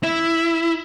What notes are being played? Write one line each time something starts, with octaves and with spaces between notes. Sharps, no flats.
E4